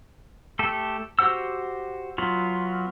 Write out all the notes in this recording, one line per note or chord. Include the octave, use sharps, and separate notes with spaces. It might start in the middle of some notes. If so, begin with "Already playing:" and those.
A3 G4 A4
F#4 G4 C5 F#5 E6
F#3 B3 F4